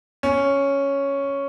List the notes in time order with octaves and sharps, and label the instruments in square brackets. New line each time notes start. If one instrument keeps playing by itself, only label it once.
[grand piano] C#4